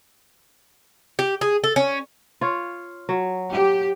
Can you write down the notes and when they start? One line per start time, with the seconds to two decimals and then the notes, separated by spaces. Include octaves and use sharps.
1.19 G4
1.41 G#4
1.64 A4
1.76 C#4
2.41 F4 C#5
3.09 F#3
3.52 G4